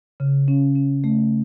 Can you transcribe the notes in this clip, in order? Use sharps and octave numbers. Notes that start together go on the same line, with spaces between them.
C#3
C#4
C#4
A3